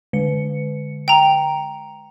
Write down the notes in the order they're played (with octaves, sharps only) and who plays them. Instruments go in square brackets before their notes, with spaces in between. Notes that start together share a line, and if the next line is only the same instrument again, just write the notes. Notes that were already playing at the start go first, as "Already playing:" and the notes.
[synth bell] D3 G#3 C#7
[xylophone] G5 A#5